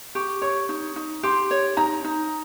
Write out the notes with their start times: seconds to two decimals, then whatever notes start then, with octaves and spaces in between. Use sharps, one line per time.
0.15 G4 C#6
0.42 C#5 C#6
0.69 D#4
0.96 D#4
1.23 G4 C6
1.51 C#5
1.77 D#4 A#5
2.04 D#4